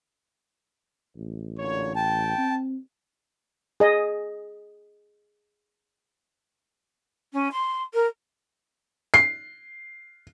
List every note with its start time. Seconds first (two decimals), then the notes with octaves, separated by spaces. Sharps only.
1.17 A1
1.58 A#2 D3 C#5
1.96 G5 A5
2.38 C4
3.80 G#4 D#5
7.32 C#4
7.51 C6
7.93 A#4
9.14 C7